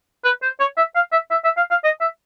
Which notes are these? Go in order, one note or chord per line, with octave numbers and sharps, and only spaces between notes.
B4
C5
C#5
E5
F5
E5
E5
E5
F5
F5
D#5
E5